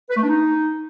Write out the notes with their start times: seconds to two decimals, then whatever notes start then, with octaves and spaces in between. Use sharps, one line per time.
0.10 B4
0.16 A3
0.22 D4
0.28 D#4